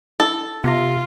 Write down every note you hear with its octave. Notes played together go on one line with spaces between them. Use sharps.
E4 A4
C3 B3 F4 A#6